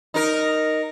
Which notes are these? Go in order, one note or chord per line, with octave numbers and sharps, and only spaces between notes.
D#4 A#4